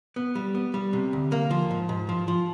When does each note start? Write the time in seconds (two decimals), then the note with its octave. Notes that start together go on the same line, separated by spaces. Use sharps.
0.16 B3
0.35 G3
0.55 B3
0.74 G3
0.93 C3
1.13 D2
1.32 A#3
1.51 F3
1.71 G#2
1.89 G#2
2.09 F3
2.28 F3